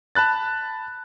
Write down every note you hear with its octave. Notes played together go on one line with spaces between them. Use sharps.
A5 B5 F#6 A6